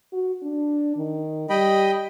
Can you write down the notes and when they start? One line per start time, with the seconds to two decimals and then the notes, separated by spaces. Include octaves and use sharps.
0.12 F#4
0.43 D4
0.97 D#3
1.50 G3 D#5 G5 B5